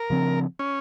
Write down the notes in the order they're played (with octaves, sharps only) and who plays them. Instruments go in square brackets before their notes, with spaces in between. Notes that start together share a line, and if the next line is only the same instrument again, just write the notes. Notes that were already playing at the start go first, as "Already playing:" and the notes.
Already playing: [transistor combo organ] A#4
[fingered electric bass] C#3 F3 C4
[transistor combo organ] C#4